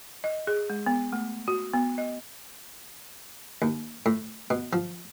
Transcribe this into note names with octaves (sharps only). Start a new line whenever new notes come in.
D#5
G#4
G#3
B3
A3
F#4
B3
D#5
D#2
A2
B2
F3